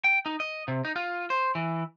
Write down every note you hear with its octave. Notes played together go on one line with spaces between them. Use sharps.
G5
D#4
D#5
C3
D#4
F4
C5
E3